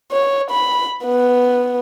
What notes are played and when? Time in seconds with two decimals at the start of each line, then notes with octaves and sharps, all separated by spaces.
0.12 C#5
0.51 B5
1.05 B3